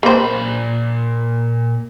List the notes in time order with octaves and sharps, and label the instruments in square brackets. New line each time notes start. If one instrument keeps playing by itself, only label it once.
[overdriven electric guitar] A#2 B5 [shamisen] A#3 C5